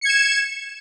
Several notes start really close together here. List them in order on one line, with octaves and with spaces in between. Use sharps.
C#7 G#6 E7